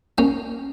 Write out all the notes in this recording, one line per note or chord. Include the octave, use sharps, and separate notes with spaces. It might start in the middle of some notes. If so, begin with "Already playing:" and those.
A#3 C#4